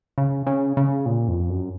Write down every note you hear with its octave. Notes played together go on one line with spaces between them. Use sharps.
C#3
C#3
C#3
A#2
F2
F#2